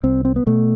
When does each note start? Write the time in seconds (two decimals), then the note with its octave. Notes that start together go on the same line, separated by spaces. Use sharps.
0.03 C2 C4
0.25 C4
0.36 B3
0.47 B2 A3